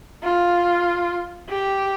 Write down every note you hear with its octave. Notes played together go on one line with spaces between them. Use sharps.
F4
G4